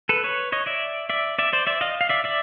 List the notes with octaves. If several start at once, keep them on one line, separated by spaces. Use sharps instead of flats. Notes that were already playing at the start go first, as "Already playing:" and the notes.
A4 B4
B4 C#5
C#5 D#5
D5 E5
D5 E5
D5 E5
C5 D5
D5 E5
D#5 F5
F5
D5 E5
D5 E5